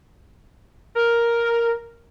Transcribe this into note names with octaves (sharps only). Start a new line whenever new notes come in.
A#4